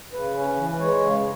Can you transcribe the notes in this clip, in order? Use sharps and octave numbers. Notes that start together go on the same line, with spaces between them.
C#3 B4
C#4
E3
G#3 C#5
C#3